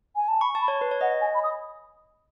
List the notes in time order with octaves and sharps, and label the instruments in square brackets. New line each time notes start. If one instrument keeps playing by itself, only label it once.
[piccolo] G#5
A5
[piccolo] B5 [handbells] C#6
[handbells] A5
[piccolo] B5
[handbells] C#5
B4
C#5
[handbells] D#5 [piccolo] F#5
[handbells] D#5
[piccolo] G#5
B5
D#6